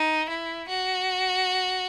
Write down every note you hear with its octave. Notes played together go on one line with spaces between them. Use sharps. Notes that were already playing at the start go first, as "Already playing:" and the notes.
Already playing: D#4
E4
F#4